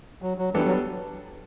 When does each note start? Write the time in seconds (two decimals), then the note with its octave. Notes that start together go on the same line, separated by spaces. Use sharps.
0.22 F#3
0.38 F#3
0.54 E3 G3 B3 D4 A4
0.66 F#3